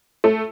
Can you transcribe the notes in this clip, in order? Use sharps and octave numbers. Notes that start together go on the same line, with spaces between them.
A3